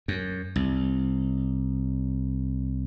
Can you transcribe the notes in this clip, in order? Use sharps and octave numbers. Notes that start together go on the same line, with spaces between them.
F#2
C2